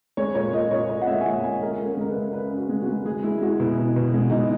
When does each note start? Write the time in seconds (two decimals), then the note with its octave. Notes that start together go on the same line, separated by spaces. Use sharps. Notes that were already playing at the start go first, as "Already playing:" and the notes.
0.17 G#3 C#5
0.35 A#2 C#5
0.53 A#2 D#5
0.71 A#2 C#5
0.89 A#2 D#5
1.01 F#5
1.07 G#3 E5
1.21 G#5
1.25 A#2 F#5
1.43 G#3 G#5
1.62 G#3 A#4
1.79 C#3
1.85 A#4
1.97 G#3 A#4
2.10 B4
2.16 C#3
2.33 C#3 B4
2.52 C#3
2.58 F#4
2.69 G#3
2.82 F#4
2.88 G#3
3.05 G#3 G#4
3.23 G#3 E4
3.42 G#3 F#4
3.59 B2 E4
3.78 B2
3.96 B2
4.14 G#3
4.30 B2 D#4
4.40 E4